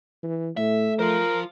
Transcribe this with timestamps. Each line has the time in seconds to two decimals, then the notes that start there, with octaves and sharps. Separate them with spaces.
0.23 E3
0.57 A2 A3 E5
0.99 F3 F4 A#4 C5